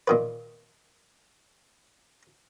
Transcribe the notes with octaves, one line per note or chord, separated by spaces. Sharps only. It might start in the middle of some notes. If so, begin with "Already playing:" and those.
A#2 D#3 B4